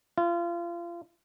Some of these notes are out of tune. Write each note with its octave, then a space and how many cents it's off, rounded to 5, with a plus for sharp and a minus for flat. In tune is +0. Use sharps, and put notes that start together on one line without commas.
F4 -30